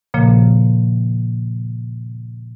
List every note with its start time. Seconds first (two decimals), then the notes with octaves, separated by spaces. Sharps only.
0.14 A#2 C#3 F3 A#3